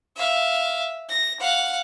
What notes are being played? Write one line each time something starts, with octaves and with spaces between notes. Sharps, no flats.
E5 F5
A#6
F5 F#5